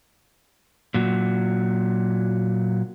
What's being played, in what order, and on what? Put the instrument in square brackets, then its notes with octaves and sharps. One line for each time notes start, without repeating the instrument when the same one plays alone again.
[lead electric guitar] A#2 F#3